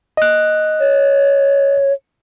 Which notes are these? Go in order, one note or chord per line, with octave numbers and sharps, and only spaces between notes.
D#5 F#6
C#5